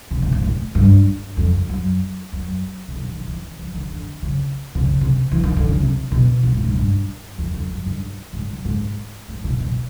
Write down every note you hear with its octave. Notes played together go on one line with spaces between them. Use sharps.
C3
B2
A#2
A2
G2
F2
F2
F#2
F#2
C3
B2
D#3
E3
E3
D#3
D3
C#3
C3
C#3
C3
E3
D#3
D3
C#3
C3
B2
B2
A2
G#2
G2
E2
F2
F#2
G2
G#2
F#2
G#2
A2
B2
A#2